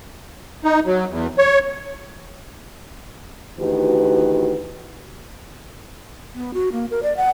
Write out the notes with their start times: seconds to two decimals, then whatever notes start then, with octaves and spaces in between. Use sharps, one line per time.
0.64 D#4
0.86 F#3
1.11 E2
1.38 C#5
3.59 D2 D#3 E3 F#4 G4 B4
6.35 B3
6.54 F#4
6.72 A#3
6.91 A#4
7.03 D5
7.17 F#5